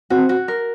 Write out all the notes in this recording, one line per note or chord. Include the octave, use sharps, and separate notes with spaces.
C4 F#4
F#4
A#4